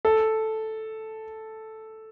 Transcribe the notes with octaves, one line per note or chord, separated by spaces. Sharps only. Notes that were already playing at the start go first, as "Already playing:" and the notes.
A4